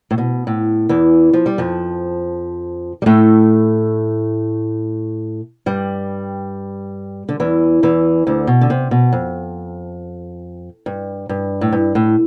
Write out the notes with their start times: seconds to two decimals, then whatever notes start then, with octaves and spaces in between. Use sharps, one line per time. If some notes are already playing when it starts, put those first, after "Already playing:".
0.11 A2
0.18 B2
0.47 A2
0.89 E2 E3
1.33 F3
1.46 G3
1.58 F2 F3
3.02 G3
3.06 A2 A3
5.66 G2 G3
7.29 D3
7.40 E2 E3
7.83 E2 E3
8.27 D2 D3
8.47 B2
8.61 D3
8.70 C3
8.91 B2
9.13 F2
10.86 G2
11.29 G2
11.61 A2
11.72 G2
11.95 A2